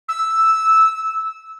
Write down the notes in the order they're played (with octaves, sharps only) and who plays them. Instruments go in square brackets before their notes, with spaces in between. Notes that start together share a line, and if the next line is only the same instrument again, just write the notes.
[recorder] E6